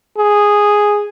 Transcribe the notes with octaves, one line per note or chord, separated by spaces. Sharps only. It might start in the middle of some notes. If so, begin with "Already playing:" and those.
G#4